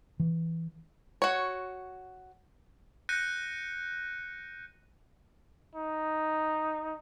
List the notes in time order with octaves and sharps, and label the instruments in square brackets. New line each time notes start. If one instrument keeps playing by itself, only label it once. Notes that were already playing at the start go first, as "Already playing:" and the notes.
[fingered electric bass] E3
[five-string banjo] F#4 C#5
[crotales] F#6 G6 A#6 C#7 D#7
[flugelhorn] D#4